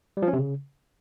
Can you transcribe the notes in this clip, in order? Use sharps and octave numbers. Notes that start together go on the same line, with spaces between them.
G3
F3
C#4
C3
C#3